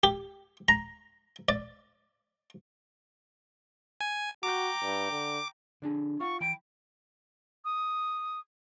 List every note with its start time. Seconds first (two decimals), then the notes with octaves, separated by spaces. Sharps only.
0.03 G4
0.68 A#5
1.49 D5
4.01 G#5
4.43 F#4 G5 A#5 D6
4.83 G2
5.11 D3
5.82 D3 D4 G#4
6.20 F4 F5 F#5 C#6
6.41 E3 G5 B5 D7
7.64 D#6